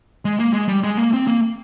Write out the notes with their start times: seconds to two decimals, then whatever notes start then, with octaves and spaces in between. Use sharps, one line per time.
0.25 G#3
0.39 A#3
0.53 G#3
0.68 G3
0.84 G#3
0.97 A#3
1.13 C4
1.28 A#3